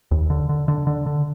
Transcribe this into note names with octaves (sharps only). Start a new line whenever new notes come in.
D#2
D3
D3
D3
D3
D3